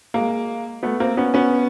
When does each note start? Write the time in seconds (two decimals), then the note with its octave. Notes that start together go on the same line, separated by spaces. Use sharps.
0.14 G#3 A#3
0.83 A3 B3
1.00 A#3 C4
1.17 B3 C#4
1.34 B3 C#4